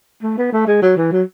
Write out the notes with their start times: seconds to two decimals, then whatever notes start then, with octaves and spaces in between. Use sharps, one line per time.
0.23 A3
0.38 B3
0.52 A3
0.67 G#3
0.82 F#3
0.96 E3
1.12 F#3